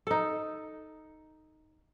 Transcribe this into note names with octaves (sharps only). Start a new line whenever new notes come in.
D#4 A4